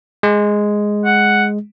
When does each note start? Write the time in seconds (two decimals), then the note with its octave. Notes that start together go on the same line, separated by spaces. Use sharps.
0.23 G#3
1.05 F#5